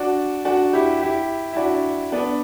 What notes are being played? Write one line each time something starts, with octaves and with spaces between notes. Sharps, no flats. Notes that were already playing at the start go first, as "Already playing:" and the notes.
Already playing: D4 F#4
D4 F#4
E4 G4
E4 G4
E4
D4 F#4
B3 D4